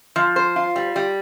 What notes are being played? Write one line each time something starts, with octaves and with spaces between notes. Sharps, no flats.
F3
C5
F4
G3
G3